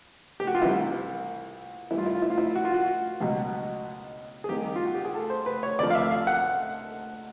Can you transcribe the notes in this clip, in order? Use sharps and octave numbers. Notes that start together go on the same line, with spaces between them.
G4
F#4
F4
C2 C3 E3 G3 E4
G2 E3 G3 E4
F4
E4
F4
E4
F4
E4
F#4
F4
F#4
C#2 B2 F#3
G#4
C2 C3 D#3 G3 G4
F4
F#4
G4
G#4
A4
C5
B4
C#5
D2 C3 F3 D5
F5
E5
F5
F#5